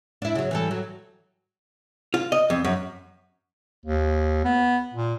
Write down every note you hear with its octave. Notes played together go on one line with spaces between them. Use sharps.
D4 E4
C#3 F#3
E3 G3 A4
F#3
F4
D#5
F2
F#2
D#2
B3
A#2